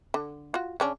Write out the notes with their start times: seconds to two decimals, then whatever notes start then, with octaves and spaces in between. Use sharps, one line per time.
0.14 D3
0.54 F4 F#4
0.80 C#3 C#4 D4